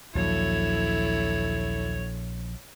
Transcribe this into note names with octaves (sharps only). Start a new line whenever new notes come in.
A#1 D#2 F#3 E4 A4 C#5